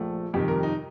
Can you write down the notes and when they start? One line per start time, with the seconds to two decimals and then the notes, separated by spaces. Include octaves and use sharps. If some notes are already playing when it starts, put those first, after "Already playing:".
Already playing: A#1 F3 A3
0.33 F2 C3 D#3 G3 G4
0.48 A#4
0.63 D#4